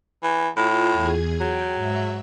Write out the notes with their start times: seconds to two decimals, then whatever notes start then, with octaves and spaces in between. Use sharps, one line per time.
0.23 E3
0.57 A2 F4
0.93 E2 G#4 G#6
1.41 F#3 G5
1.75 G#2 E5